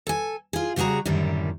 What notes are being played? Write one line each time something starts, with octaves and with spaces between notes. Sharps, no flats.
A4 G#5
F4 G#4
C#3 G3 F#4 G#4 A#5
F#2 A2 D3 D#3 G3